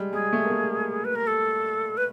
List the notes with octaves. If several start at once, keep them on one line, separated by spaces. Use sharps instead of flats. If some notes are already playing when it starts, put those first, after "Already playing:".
Already playing: G3 G#3
G#3 G#4
A3
A#3
A3
B4
A#4
A4
B4